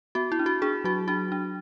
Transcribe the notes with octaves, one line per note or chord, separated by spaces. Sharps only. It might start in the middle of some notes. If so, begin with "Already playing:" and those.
B3 F#4
E4
D4
F#4
D4 G#4
F#3 F#4
D4 F#4
D4